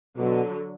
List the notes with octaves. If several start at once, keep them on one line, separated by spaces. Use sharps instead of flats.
B2 D3 F#3